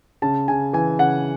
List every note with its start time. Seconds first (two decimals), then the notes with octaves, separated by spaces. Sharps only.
0.22 C#3 A5
0.48 C#3 G#5
0.73 E3 G#5
0.99 C#3 F#5